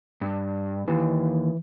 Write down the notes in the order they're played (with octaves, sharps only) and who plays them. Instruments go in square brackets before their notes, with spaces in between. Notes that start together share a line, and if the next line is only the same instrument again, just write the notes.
[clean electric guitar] G2
[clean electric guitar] D#2 [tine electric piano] E3